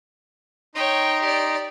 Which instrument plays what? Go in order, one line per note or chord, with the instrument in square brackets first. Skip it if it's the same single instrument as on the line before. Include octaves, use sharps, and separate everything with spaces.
[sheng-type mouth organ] D#4 A#5 C6 [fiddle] C#5 G5
[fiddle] G4 D5